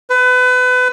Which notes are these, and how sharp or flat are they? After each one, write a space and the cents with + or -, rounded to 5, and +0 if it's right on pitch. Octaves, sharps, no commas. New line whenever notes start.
B4 +30